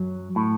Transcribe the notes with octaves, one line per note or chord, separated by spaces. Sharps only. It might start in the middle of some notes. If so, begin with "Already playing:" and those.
Already playing: F#2 F#3
A2